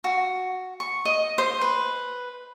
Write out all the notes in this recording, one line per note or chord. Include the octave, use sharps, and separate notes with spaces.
F#4
C#6
D#5
C5
B4